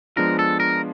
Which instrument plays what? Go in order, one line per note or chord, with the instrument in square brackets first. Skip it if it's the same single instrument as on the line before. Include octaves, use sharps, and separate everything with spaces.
[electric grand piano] F3 G#3 B3 D4 F4 [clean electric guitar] A#4
[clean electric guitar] A4
A#4